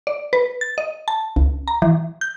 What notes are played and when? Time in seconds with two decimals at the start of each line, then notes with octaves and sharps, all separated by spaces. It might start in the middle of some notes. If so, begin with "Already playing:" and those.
0.07 D5
0.33 B4
0.61 A6
0.78 D#5
1.08 A5
1.36 C#2
1.68 A#5
1.82 E3
2.21 G6